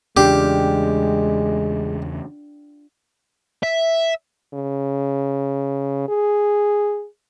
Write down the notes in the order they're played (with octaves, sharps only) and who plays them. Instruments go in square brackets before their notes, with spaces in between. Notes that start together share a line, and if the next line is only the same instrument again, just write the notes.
[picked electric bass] E2 C#3 [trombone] G#3 [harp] D4 F4 G5 [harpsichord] G4
[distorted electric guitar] E5
[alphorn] C#3
G#4